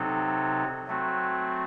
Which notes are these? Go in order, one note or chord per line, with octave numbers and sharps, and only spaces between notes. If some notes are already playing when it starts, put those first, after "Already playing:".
Already playing: C3 F#3 C4 D#4 A4
F#3 A3 C4 F#4